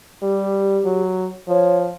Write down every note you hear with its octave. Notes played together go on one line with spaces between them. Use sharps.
G3 G4
F#3
F3 C#5